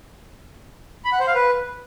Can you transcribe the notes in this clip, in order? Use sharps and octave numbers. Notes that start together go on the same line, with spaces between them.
B5
F#5
C5
F5
B4